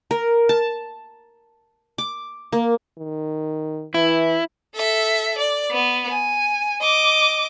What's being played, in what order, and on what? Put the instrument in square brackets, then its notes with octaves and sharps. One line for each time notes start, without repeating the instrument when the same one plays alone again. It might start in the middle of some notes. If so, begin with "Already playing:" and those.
[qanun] A#4
A5
D6
A#3
[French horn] D#3
[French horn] E3 [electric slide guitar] E4
[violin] A4 E5
D5
B3
G#5
D#5 D6